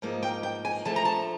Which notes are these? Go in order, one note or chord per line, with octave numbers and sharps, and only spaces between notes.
G#2 F3 A#3 D#4
G5
G5
G#5
D2 D3 F3 A3 A5
A#5
A5